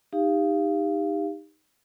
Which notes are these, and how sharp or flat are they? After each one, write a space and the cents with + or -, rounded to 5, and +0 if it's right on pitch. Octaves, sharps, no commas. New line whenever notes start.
D#4 +0 G4 +25 F5 -15